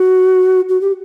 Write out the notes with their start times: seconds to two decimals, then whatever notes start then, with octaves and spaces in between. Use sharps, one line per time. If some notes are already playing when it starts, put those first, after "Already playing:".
Already playing: F#4
0.69 F#4
0.81 G4